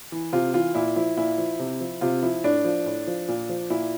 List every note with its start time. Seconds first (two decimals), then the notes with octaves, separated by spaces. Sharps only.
0.12 E3
0.32 C3 F4
0.54 E3 F4
0.75 A#2 E4
0.96 F3 E4
1.17 A#2 E4
1.38 F3
1.59 C3
1.81 F3
2.01 C3 F4
2.23 F3 E4
2.44 A2 D4
2.65 F3
2.86 A2
3.07 F3
3.28 A#2
3.49 F3
3.70 A#2 E4